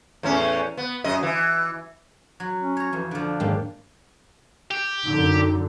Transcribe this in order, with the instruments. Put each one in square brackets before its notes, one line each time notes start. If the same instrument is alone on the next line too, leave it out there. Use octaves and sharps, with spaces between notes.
[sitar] E2 A2 C#4
B3
F#2 D#5
E3
[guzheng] F#3
[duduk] C#4
[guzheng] C#5 A#5
[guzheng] F2 [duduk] E3
[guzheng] D3 F3 [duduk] D4
[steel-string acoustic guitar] D#2 G#2
[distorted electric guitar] G4
[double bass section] F#2 D3 [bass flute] D#4